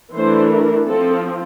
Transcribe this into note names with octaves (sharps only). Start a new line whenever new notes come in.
E3 A3 D4 C5
A#4
F3 C4 A4